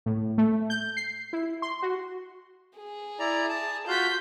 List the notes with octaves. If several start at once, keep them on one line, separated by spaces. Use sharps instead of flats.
A2
A3
G6
C7
E4
C6
F#4
G#4
E4 D5 A#5
A5
F4 F#4 F5 G6 B6